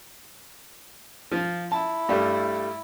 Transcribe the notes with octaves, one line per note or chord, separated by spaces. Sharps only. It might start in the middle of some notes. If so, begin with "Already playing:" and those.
F3 F4
E4 A5
G2 G3 A3